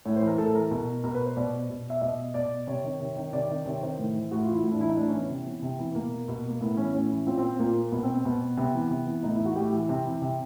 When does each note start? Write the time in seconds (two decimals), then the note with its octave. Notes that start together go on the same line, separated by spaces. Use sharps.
0.05 A2 C#5
0.16 C5
0.22 E3
0.27 A#4
0.38 A2 A4
0.55 E3 A#4
0.71 B2
1.04 B2 A#4
1.14 B4
1.25 C5
1.36 B2 D5
1.69 B2
1.90 E5
2.02 B2 D#5
2.34 B2 D5
2.67 C3 C#5
2.84 D#3
3.00 C3
3.16 D#3
3.33 C3 D5
3.49 D#3
3.66 C3 C#5
3.82 D#3 C5
3.99 A2
4.16 E3
4.31 A2 F#4
4.43 F4
4.48 E3 E4
4.64 A2 E4
4.72 D4
4.80 E3 E4
4.89 D#4
4.97 A2 D4
5.08 C#4
5.13 E3
5.19 B3
5.30 C3
5.46 E3
5.62 C3
5.79 E3
5.91 B3
5.95 B2 A#3
6.28 B2
6.49 A#3
6.61 A2 B3
6.77 E3 C#4
6.93 A2 C#4
7.11 E3
7.26 A#2 C4
7.38 C4
7.59 A#2 A#3
7.92 B2 B3
8.03 C4
8.14 C4
8.25 B2 B3
8.57 C3 B3
8.74 E3
8.90 C3
9.07 E3
9.23 A2 D#4
9.34 E4
9.39 E3
9.45 F#4
9.56 A2 G4
9.73 E3
9.89 C3
10.05 E3
10.22 C3